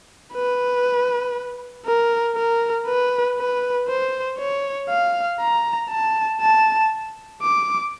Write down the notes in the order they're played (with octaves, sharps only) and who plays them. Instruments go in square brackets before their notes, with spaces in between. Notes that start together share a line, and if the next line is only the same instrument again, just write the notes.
[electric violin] B4
A#4
A#4
B4
B4
C5
C#5
F5
A#5
A5
A5
D6